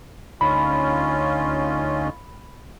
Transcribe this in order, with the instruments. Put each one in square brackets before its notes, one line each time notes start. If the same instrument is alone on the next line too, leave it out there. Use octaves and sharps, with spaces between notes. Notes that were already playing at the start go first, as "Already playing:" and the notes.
[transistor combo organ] D2 D#4 [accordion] C#4 F4 [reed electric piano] B5